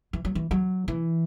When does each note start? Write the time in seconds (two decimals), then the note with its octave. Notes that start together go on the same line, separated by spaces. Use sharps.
0.13 E3
0.25 F#3
0.35 E3
0.51 F#3
0.88 E3